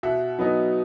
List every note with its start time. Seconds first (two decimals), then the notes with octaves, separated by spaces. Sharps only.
0.03 B2 E5 F#5
0.39 F#3 B3 D#4